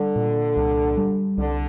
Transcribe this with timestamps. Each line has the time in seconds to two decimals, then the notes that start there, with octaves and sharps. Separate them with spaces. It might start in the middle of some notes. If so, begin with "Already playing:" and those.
Already playing: D3 G3
0.16 A#2
0.56 C2
0.97 G3
1.37 C2 D3